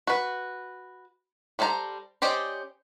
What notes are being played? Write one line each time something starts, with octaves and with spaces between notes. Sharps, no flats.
F#4 B4
G3 A4 C5 A5 A#5
C#4 G4 C5 D5 D#5